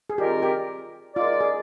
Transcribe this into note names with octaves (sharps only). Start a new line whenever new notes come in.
G#4
D#3 G3 C4 F4 G4 A#4
G4
G#3 D#4 F4 A#4 D5
G#4